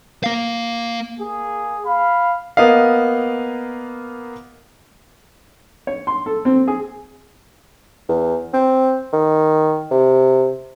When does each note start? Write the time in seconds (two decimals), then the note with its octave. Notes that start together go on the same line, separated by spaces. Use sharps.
0.24 A#3 F5
1.18 A#3 G#4
1.84 F5 B5
2.57 A#3 B3 D#5 F5
5.87 C#5
6.07 C6
6.26 A4
6.45 C4
6.68 G#4
8.09 E2
8.53 C4
9.13 D#3
9.91 C3